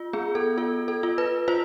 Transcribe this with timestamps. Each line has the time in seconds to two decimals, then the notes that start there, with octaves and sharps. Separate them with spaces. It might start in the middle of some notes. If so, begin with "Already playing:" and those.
Already playing: F4
0.13 B3 G#4
0.35 A4
0.58 F4 A4
0.88 A4
1.03 F4
1.18 B4
1.48 F4 C5